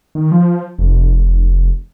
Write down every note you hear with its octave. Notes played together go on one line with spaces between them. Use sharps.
D#3
F3
F1